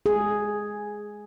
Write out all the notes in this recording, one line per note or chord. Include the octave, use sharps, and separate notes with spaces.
G#4